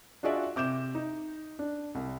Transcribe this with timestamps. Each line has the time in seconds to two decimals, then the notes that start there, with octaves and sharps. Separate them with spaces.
0.23 D4 F4 F#4 G#4 D5 E5
0.56 C3 D6 G6 E7
0.95 D#4
1.59 D4
1.95 C2